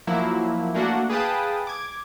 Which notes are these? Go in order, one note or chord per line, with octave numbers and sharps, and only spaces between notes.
F3 F#3 A#3 E4
A3 A#3 D4 F#4 F#5
G#4 B4 F5 G5 A5 D#6
D6 G#6